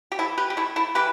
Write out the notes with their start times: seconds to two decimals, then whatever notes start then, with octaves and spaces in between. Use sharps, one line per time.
0.12 G4
0.19 E3 E4 A4
0.38 G4 B4
0.50 G4
0.57 A3 E4 A4
0.76 E4 A4
0.95 E3 G4 B4